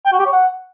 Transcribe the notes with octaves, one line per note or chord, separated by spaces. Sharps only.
G5
F#4
G4
C#5
F#5